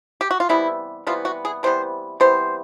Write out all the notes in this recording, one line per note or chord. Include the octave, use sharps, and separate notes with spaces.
G4
F#4
F4
C3 E3 G3 B3 E4
C3 E3 G3 B3 F4
F#4
G#4
C3 E3 G3 B3 C5
C3 E3 G3 B3 C5